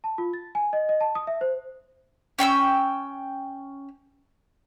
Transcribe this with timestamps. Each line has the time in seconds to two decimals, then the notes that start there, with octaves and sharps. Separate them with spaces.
0.04 A5
0.18 F4
0.33 A6
0.55 G#5
0.73 D#5
0.89 D#5
1.01 A5
1.15 D#6
1.27 E5
1.41 C5
2.39 C#4 G5 C6 E6